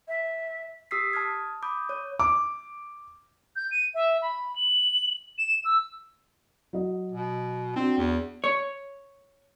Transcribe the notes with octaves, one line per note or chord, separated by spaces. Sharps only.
E5
G4 D#6 E6 B6 C7
A5 D#6 F6 G#6
B5 D6 D#6 G6
C#5
D6
G6
D#7
E5
B5
F#7
E7
E6
F#3 D#5
B2
C4 D4 F#4
E2
C#5